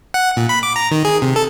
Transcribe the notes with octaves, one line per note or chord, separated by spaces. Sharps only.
F#5
A#2
B5
D6
A#5
D#3
G#4
C3
A4